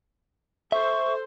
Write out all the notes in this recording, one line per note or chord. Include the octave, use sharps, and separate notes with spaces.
A4 C5 E5 C#6